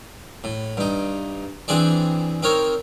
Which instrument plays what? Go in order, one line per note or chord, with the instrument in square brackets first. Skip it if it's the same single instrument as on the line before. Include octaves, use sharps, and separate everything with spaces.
[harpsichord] A2
G2 D#4
E3 C4 D4 G#4 D5
C4 D#4 A#4 C#5